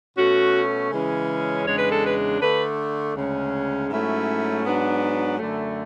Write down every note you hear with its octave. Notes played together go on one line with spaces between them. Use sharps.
B2 A3 C#4 F#4
C#3 E3 G#3 C#4
E2 C#3 G#3 D4 C#5
B4
A4
B4
D3 A3 D4 B4
D2 C#3 G#3 C#4
G#2 F#3 A3 C#4 E4
G#2 F#3 B3 D4
F#2 D3 A3